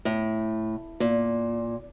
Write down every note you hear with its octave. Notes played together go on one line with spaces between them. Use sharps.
A2
A#2